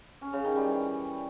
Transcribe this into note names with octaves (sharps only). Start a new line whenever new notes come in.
C#4
C#3
D#3
G3
E3